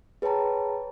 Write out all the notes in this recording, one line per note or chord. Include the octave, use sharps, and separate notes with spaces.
G#4 B4 C#5 G5 A5 A#5